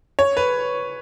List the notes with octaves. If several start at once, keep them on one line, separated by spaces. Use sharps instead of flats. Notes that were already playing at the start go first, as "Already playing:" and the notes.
C#5
B4